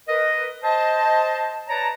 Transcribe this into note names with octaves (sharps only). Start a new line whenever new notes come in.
A#4 B4 D#5
C5 D#5 A5
B4 C#5 D5 A5 A#5